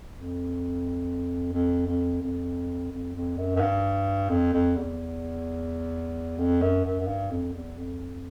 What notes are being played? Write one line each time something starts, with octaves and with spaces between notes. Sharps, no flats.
F2
F2
F2
F2
F2
F2
F#2
F#2
G2
F2
F2
E2
F2
F#2
F#2
F#2
G2
F2
E2
F2